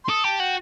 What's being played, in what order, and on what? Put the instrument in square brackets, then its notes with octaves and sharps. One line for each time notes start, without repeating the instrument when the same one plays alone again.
[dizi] C6
[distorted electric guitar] A4 [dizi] D#6
[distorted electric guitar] G4 [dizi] A5
[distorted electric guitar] F#4 [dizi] G5